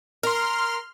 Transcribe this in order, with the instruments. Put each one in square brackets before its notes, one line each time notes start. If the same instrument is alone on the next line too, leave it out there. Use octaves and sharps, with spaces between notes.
[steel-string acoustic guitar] A#4 [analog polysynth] C6 F6